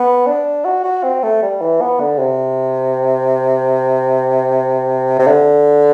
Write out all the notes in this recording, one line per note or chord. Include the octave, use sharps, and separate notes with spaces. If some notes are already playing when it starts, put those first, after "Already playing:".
Already playing: B3
D4
F#4
F#4
C4
A3
G3
E3
B3
D3
C3
C3
D3